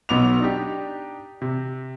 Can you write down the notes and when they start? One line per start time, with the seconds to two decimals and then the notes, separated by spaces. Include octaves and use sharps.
0.09 B1 B3 D6 F7
0.40 D4 D#4 G4
1.42 C3